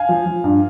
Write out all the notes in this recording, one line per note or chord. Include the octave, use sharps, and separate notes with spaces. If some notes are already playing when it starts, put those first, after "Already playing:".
Already playing: F5 G#5
F3
F3
G2